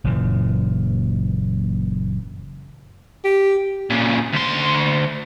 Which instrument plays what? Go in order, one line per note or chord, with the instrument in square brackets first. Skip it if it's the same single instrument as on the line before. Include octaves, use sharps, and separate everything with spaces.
[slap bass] F#1 F#2 A#2 E3
[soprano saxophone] G4
[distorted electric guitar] A#2 C#3
D2 C6